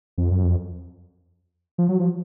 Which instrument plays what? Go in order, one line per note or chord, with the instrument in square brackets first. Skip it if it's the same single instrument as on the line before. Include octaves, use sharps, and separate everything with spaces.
[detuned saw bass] F2
F#2
F2
F3
F#3
F3